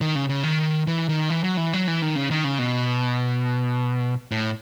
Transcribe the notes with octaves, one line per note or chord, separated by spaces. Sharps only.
D#3
C#3
C#3
D#3
E3
D#3
E3
F#3
E3
F#3
E3
D#3
C#3
D#3
C#3
B2
A2